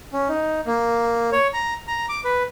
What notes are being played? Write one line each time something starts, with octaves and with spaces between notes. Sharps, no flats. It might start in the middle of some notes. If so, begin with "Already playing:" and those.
C#4
D#4
A#3
C#5
A#5
A#5
D6
B4